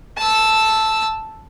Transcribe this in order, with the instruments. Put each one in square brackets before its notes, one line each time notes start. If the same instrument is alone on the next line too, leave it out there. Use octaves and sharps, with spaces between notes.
[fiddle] A5 E6